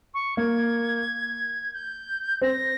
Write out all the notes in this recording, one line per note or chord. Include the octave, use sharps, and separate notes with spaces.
C#6
A#3 G#6
G6
C4 A#6